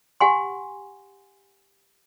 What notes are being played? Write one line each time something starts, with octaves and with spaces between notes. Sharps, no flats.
G4 F#5 G#5 C6